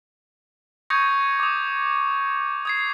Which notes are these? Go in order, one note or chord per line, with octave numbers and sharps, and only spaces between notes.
C#6 D#6 G6 G#6 A#6 C#7
D6 D#6
D#6 G#6 C7